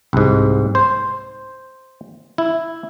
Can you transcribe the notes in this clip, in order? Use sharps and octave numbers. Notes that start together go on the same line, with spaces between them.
C2 G#2
C5
E4